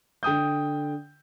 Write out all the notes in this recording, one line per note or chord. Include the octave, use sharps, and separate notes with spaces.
D3 G5 D#6 G6